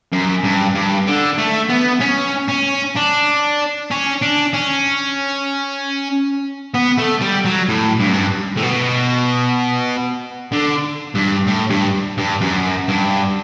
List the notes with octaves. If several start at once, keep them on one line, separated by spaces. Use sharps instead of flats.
F#2
G2
G2
D3
A3
B3
C#4
C#4
D4
C#4
D4
C#4
B3
A3
G3
F#3
A2
G2
F#2
G2
A2
B2
D3
G2
A2
G2
G2
F#2
G2